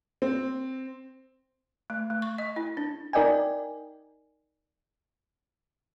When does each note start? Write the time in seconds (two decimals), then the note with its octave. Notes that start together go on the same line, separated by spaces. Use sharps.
0.22 C4
1.90 A3
2.10 A3
2.22 C#6
2.38 D#5
2.56 E4
2.77 D4
3.13 D#4 A#4 D5 D#5 G5 G#5